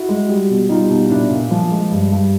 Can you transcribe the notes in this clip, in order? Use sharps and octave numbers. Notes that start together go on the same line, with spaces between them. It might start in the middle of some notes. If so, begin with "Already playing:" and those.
Already playing: E4 F#4
G#3
G3
B2
G3 D#4 F4
B2
A#2 D4 E4
A#2
F3
G#3
G2
G2